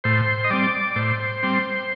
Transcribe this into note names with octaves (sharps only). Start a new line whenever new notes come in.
A2 C5
D#5
G3 C4 D5
A2 C5
G3 C4